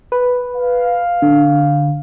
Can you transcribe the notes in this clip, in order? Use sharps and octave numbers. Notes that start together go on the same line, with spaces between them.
B4
F5
D3